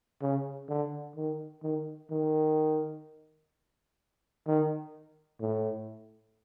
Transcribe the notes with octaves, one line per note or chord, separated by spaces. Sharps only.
C#3
D3
D#3
D#3
D#3
D#3
A2